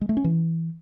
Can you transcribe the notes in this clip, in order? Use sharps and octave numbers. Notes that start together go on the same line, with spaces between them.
G#3
A3
C#4
E3